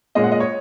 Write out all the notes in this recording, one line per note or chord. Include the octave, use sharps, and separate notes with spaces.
A#2 G#3 C#4 D#5
F#5
D#5
C#5